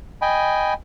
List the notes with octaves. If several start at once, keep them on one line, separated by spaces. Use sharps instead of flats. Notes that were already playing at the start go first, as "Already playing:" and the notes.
D#5 G5 G#5 B5